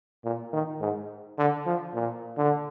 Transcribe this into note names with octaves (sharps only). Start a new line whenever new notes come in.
A#2
D#3
G#2
D3
F3
A#2
D3